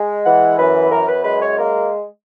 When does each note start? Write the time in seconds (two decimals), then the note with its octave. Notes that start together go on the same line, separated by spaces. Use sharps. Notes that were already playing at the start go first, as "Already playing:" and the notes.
Already playing: G#3
0.24 E3 F#5
0.58 F#2 B4
0.91 F#2 A#4
1.08 B4
1.25 G#3 B4
1.41 C#5
1.58 A#3 A#4